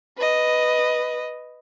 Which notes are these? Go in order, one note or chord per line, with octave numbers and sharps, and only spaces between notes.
B4 D#5